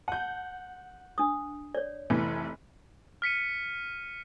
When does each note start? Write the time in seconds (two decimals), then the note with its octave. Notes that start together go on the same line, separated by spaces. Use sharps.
0.08 F#5 A5 G6
1.18 D4 D#6
1.75 C#5 D5
2.10 F1 E3 A3
3.22 F6 B6 C#7 D#7